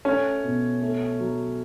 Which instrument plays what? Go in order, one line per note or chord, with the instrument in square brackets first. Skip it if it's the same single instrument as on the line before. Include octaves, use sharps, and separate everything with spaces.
[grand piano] A3 [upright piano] C#4
[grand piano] B2
A3
F#3